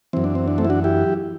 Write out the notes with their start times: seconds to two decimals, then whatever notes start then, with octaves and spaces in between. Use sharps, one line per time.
0.13 F#2 E3 C4
0.24 D4
0.35 C4
0.48 D4
0.58 A3 C4
0.65 E4
0.70 D4 F#4
0.84 E4 G4